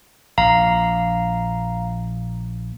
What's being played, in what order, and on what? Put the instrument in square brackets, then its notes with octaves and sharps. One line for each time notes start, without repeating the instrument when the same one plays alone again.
[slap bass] A#1 A#2 [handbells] F5 A#5